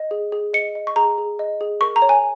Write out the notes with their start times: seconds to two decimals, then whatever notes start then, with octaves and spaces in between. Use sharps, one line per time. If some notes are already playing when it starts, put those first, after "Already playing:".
Already playing: D#5
0.11 G#4
0.32 G#4
0.54 D#5 C#7
0.75 D#5
0.87 C#6
0.96 G#4 A#5
1.18 G#4
1.39 D#5
1.61 G#4
1.81 A#4 C#6
1.96 A#5
2.02 C#5
2.09 G#5